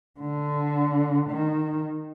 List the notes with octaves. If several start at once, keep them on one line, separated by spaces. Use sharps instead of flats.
D3
D#3